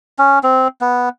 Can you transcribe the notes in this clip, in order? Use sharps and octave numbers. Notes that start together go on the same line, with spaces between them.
C#4
C4
B3